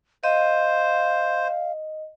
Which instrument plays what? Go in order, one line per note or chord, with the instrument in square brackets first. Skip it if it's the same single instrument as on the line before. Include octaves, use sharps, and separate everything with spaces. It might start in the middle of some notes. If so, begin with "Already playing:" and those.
[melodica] C5 [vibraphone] D#5 [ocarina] F5